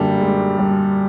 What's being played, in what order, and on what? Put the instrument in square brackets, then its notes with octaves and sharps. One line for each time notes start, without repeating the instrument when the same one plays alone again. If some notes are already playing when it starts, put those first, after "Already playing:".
Already playing: [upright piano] F#2 D3 G3 A#3 [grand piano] D4 G4
[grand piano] G#3
G3